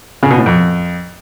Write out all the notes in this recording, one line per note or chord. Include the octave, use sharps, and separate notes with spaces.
C#3
B2
A2
F2